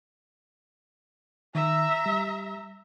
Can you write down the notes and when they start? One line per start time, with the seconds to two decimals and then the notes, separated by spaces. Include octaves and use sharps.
1.55 D#3 E5 A#5
2.06 G3